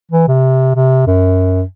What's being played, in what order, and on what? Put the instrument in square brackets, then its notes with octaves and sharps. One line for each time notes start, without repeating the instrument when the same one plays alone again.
[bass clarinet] E3
C3
C3
F#2